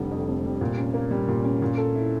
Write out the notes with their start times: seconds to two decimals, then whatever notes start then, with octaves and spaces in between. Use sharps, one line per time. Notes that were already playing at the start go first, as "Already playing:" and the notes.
Already playing: F1 D3 G3
0.11 F2
0.28 F1
0.45 G3
0.61 A#2
0.78 C#4
0.94 A#3
1.11 G3
1.28 A#2
1.44 C#4
1.62 A#2
1.78 A4
1.95 E4